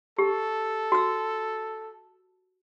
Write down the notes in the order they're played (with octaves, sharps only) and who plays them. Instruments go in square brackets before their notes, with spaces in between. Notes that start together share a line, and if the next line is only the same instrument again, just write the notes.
[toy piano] G4 [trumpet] A4
[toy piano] F#4 E6